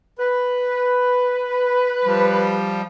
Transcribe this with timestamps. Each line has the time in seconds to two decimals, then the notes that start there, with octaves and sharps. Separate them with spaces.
0.18 B4
2.05 F3 G3